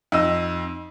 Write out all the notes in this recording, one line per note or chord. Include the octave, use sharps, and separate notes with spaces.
F2 D#4 E6